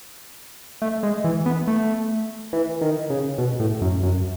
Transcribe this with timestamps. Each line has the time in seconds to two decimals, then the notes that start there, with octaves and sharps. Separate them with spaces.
0.82 A3
1.03 G#3
1.24 E3
1.46 B3
1.68 A3
2.53 E3
2.81 D#3
3.10 C#3
3.38 B2
3.60 A2
3.82 F#2
4.03 F#2